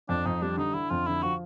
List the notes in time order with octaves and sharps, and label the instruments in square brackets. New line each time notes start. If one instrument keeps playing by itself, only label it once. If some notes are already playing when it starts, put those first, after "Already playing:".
[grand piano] F2 [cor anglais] D4
[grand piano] F2 [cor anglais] D#4
[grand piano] G3 [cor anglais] D4
[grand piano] D3 [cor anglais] D#4
[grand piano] D3 [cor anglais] E4
[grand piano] F2 [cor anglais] F4
[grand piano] D3 [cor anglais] E4
[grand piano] F3 [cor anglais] F#4